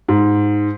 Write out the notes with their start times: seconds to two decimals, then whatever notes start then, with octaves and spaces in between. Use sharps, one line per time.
0.08 G#2